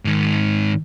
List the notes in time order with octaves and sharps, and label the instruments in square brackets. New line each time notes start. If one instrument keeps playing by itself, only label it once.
[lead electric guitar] G#2 D#3